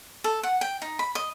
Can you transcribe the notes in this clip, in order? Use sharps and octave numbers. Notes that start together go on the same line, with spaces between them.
A4
F#5
G5
D#4
B5
D#5